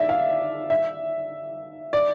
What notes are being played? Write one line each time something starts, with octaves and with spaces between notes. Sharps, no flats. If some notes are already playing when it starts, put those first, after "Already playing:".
Already playing: D5 E5
F5
E5
D5